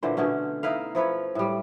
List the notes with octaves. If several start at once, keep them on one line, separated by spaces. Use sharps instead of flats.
A#2 D3 E3 C5
B2 D3 A3 C#4
D#4 E4 B4 F5
F3 E4 B4 C#5
A2 G3